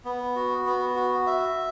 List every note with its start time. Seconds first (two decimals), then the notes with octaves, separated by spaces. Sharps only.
0.05 B3
0.36 F#4
0.66 B3
0.96 F#4
1.27 E5